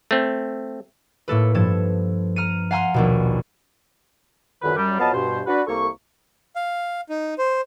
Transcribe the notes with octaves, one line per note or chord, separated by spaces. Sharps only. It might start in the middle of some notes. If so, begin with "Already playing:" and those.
A3 C4
A2 A#3 A4 B4
G2 F3 A4 G#6 E7
A#5 F6 C#7 D#7
F5 F#5 G#5 A#5 C6 F6
A#1 D#2 B2
C#2 F#2 D3 D#3 B4
F#2 G3
F2 F#3 B3 D#5 F5 A5
G2 B2 C5
D4 F#4 B4
C2 A#3 A4 C#6
F5
D#4
C5